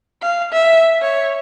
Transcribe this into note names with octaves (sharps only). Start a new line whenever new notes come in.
F5
E5
C#5